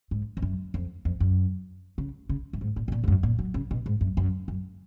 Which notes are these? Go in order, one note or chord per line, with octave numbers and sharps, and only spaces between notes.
G#2
F2
F#2
F2
F2
F#2
C#3
C#3
F#2
G#2
A#2
B2
A#2
G#2
F#2
A#2
F#3
C#3
B2
G#2
F#2
F#2
F#2